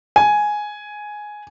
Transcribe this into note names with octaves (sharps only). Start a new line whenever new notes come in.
G#5